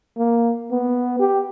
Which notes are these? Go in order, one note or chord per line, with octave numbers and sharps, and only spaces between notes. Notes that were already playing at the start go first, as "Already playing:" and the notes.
A#3
B3
G4